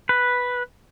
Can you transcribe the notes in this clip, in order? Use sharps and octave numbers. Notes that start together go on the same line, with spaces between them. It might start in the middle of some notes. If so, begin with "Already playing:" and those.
B4